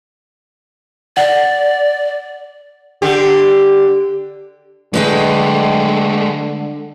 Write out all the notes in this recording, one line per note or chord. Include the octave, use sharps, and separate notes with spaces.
D5 F#5
D3 G4
D3 G#3 A3 B4 D#5 G5